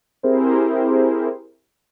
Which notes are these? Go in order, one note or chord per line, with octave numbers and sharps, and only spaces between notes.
C4 E4 G4 G#4 A#4 C5